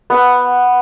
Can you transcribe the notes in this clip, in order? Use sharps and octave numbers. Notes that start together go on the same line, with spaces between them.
B3 F#5 E6